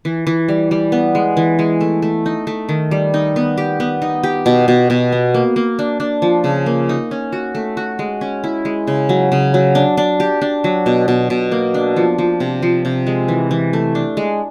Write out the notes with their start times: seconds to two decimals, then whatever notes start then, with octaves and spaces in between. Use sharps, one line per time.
0.05 E3
0.27 E3
0.48 G3
0.71 G3
0.92 B3
1.15 G#3
1.37 E3
1.59 G#3
1.81 A3
2.02 A3
2.26 D#4
2.47 A3
2.69 D#3
2.91 G3
3.14 D#4
3.36 B3
3.58 G4
3.80 B3
4.02 D#4
4.23 G4
4.46 B2
4.68 B2
4.90 B2
5.12 B3
5.34 A#3
5.56 A#3
5.79 D4
6.00 D4
6.22 F3
6.44 C#3
6.66 A#3
6.89 D#4
7.11 C#4
7.32 F#4
7.55 A3
7.77 F#4
7.99 G#3
8.21 C#4
8.44 E4
8.65 G#3
8.87 C#3
9.09 F#3
9.32 C#3
9.54 F#3
9.75 D4
9.97 D4
10.20 G4
10.42 D4
10.64 F#3
10.86 B2
11.08 B2
11.30 B2
11.52 A#3
11.74 D4
11.96 F3
12.18 F3
12.40 C3
12.62 F3
12.85 C3
13.07 G#3
13.28 E3
13.51 E3
13.73 A3
13.95 D4
14.17 G#3